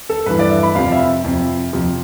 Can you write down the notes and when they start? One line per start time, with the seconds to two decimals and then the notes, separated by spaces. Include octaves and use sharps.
0.09 A4
0.26 G2 E3 B4
0.39 D5
0.50 E5
0.63 B5
0.75 F2 C3 F3 F5
0.92 E5
1.24 F2 C3 F3
1.73 F2 C3 F3